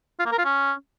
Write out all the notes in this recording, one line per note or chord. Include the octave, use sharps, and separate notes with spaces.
F4
A#3
A#4
F4
C#4